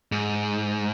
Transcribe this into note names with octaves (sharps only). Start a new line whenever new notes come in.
G#2